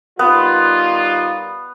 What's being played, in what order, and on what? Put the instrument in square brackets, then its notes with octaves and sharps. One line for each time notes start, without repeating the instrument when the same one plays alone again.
[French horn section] D#3 G3 F4 [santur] B3